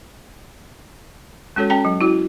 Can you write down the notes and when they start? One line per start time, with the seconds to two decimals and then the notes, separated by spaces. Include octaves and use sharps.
1.56 G#3 C#4 F#4 A4 C#5
1.70 C#4 G5 A#5
1.85 F#3
2.01 E4 F#4